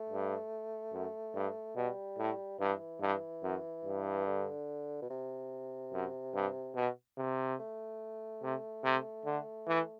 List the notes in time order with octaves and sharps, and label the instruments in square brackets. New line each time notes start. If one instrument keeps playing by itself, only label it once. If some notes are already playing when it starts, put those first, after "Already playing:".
Already playing: [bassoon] A3
[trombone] G2
F#2
G2
[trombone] B2 [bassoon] G3
[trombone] A2
[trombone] G2 [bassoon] E3
[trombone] G2
F#2
G2
[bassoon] D3
B2
C3
[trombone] F#2
G2
B2
C3
[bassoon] A3
[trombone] C3
C3
D3
E3